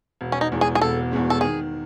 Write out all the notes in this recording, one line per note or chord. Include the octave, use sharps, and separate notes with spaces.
E1
C#4
D#4
E2 B2 G#3
G#4
G#4
E1 A4
E2 B2 G#3
A4
D#3 G#4